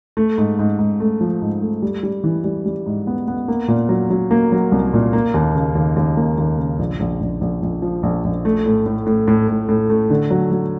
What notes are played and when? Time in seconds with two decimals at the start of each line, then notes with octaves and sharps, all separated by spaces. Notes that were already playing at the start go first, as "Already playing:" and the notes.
0.17 A3
0.38 G#2
0.59 G#2
0.79 G#2
1.00 A3
1.21 F3
1.41 G#2
1.62 A3
1.82 G3
2.03 G3
2.24 E3
2.44 G3
2.66 G3
2.86 G#2
3.07 B3
3.28 B3
3.48 A#3
3.68 A#2
3.89 F#3
4.10 F#3
4.31 A#3
4.52 F#3
4.72 C2
4.94 A#2
5.13 A#3
5.34 D#2
5.55 C#3
5.75 D#2
5.96 D#2
6.17 A#3
6.38 D#2
6.58 C#3
6.79 A#1
7.00 A#1
7.21 A#1
7.41 A#1
7.62 A#1
7.82 F3
8.03 A#1
8.24 A#1
8.45 A3
8.66 A2
8.86 A2
9.07 A2
9.28 A2
9.48 A2
9.69 A2
9.90 A3
10.10 D3
10.31 F#3
10.51 F#3